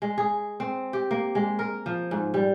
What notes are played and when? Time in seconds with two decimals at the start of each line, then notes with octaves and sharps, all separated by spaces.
0.02 G#3
0.18 G#4
0.60 C4
0.93 G4
1.11 A#3
1.35 G#3
1.59 A#4
1.86 F3
2.11 G#2
2.34 G3